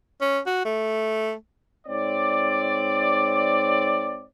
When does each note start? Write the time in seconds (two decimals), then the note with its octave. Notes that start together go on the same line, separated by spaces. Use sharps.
0.21 C#4
0.46 F#4
0.65 A3
1.87 G#2 C4 C#5 D5